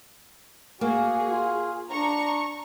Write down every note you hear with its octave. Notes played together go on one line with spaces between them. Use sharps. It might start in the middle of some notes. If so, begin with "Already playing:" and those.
A#3 F#4 G#4
F4
D4 A#5 C#6